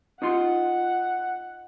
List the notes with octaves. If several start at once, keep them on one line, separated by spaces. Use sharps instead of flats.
D#4 F4 F#5 C6